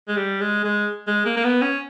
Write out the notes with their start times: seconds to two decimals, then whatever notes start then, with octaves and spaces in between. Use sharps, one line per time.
0.09 G#3
0.17 G3
0.41 G#3
0.65 G#3
1.08 G#3
1.26 A#3
1.37 A#3
1.44 B3
1.62 C#4